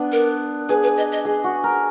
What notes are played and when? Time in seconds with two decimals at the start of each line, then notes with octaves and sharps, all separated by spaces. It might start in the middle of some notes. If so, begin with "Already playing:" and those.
Already playing: B3 D4
0.12 A#4
0.69 G#4 B4
0.83 B4
0.97 D#5
1.11 D#5
1.25 G#4
1.44 F#4
1.64 A#4